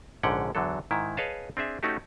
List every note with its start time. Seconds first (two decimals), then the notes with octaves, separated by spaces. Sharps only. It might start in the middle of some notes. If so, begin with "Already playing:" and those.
0.23 A#1 G#2 D3 C#4 F#5 G5
0.55 E2 D3 F#3 A4
0.91 G#2 D#3 E4
1.17 G#4 B4 C#5 D#5 F5 A5
1.57 C4 D4 G#4 E5
1.83 A3 C#4 D#4 F#4 G4